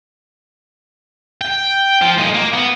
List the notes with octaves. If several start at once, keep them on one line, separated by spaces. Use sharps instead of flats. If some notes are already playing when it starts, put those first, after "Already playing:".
G5
F3
A#2 D#4
A#3
B3